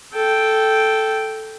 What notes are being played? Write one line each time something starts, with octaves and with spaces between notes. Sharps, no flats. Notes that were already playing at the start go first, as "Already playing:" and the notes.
A4 G5